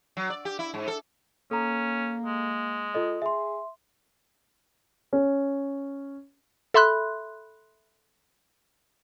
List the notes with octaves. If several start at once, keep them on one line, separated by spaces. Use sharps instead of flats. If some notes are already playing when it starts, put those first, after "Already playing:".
F#3
D5
G4
E4
G#2
A4
A#3 C#4 A4 A#5
G#3
F4 A4 D#5
G#4 E5 C6
C#4
A4 E5 B5 C6 F#6